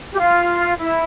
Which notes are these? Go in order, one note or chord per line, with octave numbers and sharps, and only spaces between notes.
G4
F4
E4